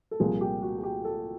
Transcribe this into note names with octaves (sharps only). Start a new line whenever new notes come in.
A4
C2 A#2 F3 G#4
G4
F#4
G#4
G4
A4